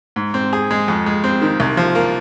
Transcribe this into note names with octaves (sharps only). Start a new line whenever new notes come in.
G#2
C4
G#4
G#3
F2
G#3
C4
D#3
C2
F3
A#3